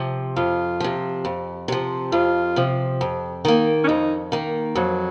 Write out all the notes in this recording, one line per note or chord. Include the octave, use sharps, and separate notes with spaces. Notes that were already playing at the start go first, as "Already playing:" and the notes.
Already playing: C3 F3
F2 F4
C3 F3
F2
C3 F3
F2 F4
C3 F3
F2
D#3 A#3
C#4
F2 D#4
D#3 A#3
F2 F#3